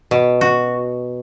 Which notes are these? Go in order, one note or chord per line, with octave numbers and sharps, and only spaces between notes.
B2
F#4